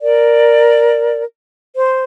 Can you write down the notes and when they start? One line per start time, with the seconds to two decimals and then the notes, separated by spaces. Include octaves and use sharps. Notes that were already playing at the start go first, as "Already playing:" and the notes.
0.01 A#4 D5
1.76 C5